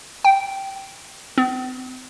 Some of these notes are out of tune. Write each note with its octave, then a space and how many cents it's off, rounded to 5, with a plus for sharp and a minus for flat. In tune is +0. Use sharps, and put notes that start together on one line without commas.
G5 -10
C4 -40